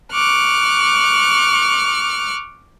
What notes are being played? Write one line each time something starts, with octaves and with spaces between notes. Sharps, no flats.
C#6 D6 F6 F#6